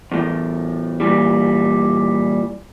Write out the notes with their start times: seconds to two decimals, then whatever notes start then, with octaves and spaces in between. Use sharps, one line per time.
0.12 E2 A2
1.00 A#2 E3 G3